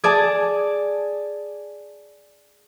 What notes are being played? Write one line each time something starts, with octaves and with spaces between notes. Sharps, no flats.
G#4 D5 A5